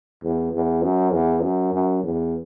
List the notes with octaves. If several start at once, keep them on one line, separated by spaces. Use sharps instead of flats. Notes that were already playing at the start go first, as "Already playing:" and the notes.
E2
E2
F#2
E2
F#2
F#2
E2